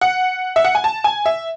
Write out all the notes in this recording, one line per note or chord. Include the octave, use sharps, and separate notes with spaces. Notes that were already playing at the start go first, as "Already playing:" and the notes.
F#5
E5
F#5
G#5
A5
G#5
E5